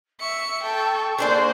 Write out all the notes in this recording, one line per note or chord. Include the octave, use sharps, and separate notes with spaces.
E5 C#6 C#7
A4 G5
A#3 D4 G#4 A4 C5 D5